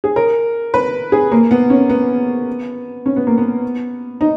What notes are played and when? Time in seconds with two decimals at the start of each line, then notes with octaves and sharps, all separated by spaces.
0.04 G#4
0.16 A#4
0.74 B4
1.12 G#4
1.32 A#3
1.51 B3
1.70 C#4
1.90 B3
3.06 C#4
3.16 B3
3.27 A#3
3.38 B3
4.21 D#4